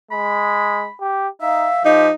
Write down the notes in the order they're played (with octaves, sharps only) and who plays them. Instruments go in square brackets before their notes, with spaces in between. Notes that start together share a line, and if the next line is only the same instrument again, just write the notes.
[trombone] G#3 [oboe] B5
[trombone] G4
[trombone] D#4 [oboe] E5 [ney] F5
[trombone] F3 [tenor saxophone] D#4 [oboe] G4